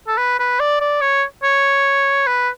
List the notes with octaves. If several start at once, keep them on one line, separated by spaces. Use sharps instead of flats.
A4
B4
B4
D5
D5
C#5
C#5
B4